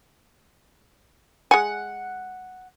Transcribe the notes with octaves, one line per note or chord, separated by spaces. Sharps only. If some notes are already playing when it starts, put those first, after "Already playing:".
G#3 F#5 G#5